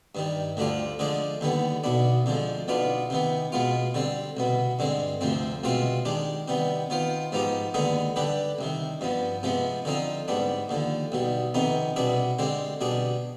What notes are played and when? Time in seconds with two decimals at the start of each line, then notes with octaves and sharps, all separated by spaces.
0.15 G2 D#3 G3
0.57 D2 D3 G3 D4 F4
0.99 D3 F3 G#3 D4 G#4
1.41 D#2 D3 G3 B3
1.84 B1 B2 B3 D4
2.26 F2 D3 F3 G#3
2.68 B1 B2 B3 D4 F4
3.10 C3 D#3 B3
3.52 B2 G#3 B3 F4
3.95 D3 G3 C4
4.37 C2 B2 B3
4.79 G2 D3 G#3 C4
5.21 D2 C3 F3 C4
5.64 C2 B2 G#3 C4 F4
6.05 D#3 G#3 D4 G4
6.48 C3 D#3 G3 B3
6.90 D#3 B3 F4 C5
7.32 G#2 F3 B3 D#4 G4
7.74 D#2 D3 G#3 B3 D#4
8.16 D3 G3 D4 G4 B4
8.59 C2 C3 D#3
9.01 G2 F3 B3
9.43 C3 F3 G#3 B3
9.85 D3 F3 C4 D#4
10.28 G#2 G3 B3 D4
10.69 D#2 D3 F3
11.12 B1 B2 G3
11.54 F2 C3 D#3 B3 D#4
11.96 C2 B2 B3 D4 G#4
12.39 D3 G#3 C4 G4
12.81 B2 G3 D4 G#4